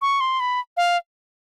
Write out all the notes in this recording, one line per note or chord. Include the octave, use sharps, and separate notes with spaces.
C#6
C6
B5
F5